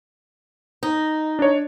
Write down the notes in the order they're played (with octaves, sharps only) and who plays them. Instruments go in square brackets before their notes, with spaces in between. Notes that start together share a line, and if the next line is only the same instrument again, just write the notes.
[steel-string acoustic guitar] D#4
[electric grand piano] D4 C#5